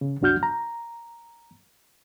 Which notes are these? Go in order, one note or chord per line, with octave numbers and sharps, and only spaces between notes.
C#3
C2 F#2 D4 F#4 F6 G6
A#5